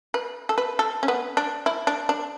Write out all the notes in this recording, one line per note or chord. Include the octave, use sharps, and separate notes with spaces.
B4
A4
B4
A4
C#4
B3
D4
E4
D4
D4